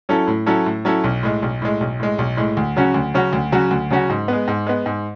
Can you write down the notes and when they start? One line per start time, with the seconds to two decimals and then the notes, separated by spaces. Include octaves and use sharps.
0.09 F#3 C#4 E4 A4
0.28 A2
0.46 F#3 C#4 E4 A4
0.66 A2
0.85 F#3 C#4 E4 A4
1.04 B1
1.23 A2 G#3
1.42 B1
1.62 A2 G#3
1.80 B1
2.00 A2 G#3
2.18 B1
2.37 A2 G#3
2.57 D2
2.76 C#3 F#3 C#4 F#4
2.94 D2
3.14 C#3 F#3 C#4 F#4
3.33 D2
3.52 C#3 F#3 C#4 F#4
3.71 D2
3.90 C#3 F#3 C#4 F#4
4.09 G#2
4.28 G#3 B3
4.48 G#2
4.66 G#3 B3
4.86 G#2